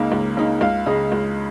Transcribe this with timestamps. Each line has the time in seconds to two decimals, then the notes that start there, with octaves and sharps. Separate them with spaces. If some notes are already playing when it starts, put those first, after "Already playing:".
Already playing: C#2 C#3 A#3 D#4
0.12 C#2
0.37 C#3 A#3 D#4
0.61 C#2 F5
0.86 C#3 G#3 D#5
1.12 C#2